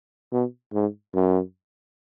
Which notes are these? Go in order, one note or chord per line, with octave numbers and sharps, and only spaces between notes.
B2
G#2
F#2